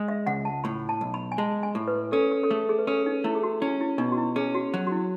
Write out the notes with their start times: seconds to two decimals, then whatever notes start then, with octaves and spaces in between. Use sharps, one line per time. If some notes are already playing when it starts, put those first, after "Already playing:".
Already playing: G#3
0.08 E5
0.26 C#2 F#5
0.45 A5
0.64 A2 B5
0.89 A5
1.01 B1
1.14 B5
1.32 G#5
1.38 G#3 A5
1.63 G#5
1.75 A2
1.88 B4
2.12 C#4 A4
2.32 A4
2.43 A4
2.50 A3 G#4
2.69 G#4
2.79 B4
2.87 C#4 A4
3.06 D#4
3.24 A3 E4
3.35 G#4
3.43 F#4
3.62 C#4 E4
3.81 E4
3.98 B2 D#4
4.12 F#4
4.17 E4
4.36 C#4 G#4
4.55 F#4
4.74 F#3
4.87 F#4
4.92 E4